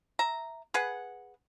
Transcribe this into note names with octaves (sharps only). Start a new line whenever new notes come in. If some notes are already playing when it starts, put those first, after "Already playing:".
E5 A#5
G#4 B4 F#5